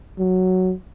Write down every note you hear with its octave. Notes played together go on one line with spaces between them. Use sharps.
F#3